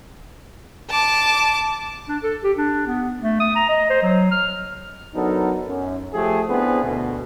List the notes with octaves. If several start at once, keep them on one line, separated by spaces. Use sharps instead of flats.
A5 D6
D4
A4
G4
D4
B3
A3
D#6
A#5
D#5
C5
F#3
F6
F#3 B3 D4 D#4 A4 A#4
F#2
F3 A3 G4 G#4
B3 C4 D4 E4 G#4 B4
D2 B2